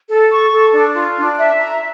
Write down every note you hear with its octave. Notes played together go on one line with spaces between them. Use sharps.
A4
C#6
A4
D4
F4
D4
E5
A#5